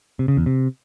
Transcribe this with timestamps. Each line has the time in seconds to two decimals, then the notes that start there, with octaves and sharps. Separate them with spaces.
0.19 C3
0.28 C#3
0.37 E2
0.46 C3